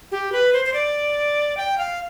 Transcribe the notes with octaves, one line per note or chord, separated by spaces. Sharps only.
G4
B4
C5
C5
D5
G5
F5